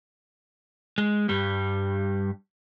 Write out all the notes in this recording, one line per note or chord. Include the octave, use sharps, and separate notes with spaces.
G#3
G2 G3